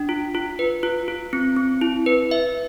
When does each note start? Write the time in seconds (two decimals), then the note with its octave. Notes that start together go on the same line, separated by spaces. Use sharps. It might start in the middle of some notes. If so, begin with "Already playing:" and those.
Already playing: D4
0.09 F4
0.35 F4
0.59 B4
0.83 F4
1.08 F4
1.33 C4
1.56 C4
1.81 E4
2.06 B4
2.31 E5